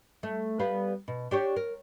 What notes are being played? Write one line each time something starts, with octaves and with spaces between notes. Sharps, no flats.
A3
G3 B3 F5
B2
D4 G4 C#5
A#4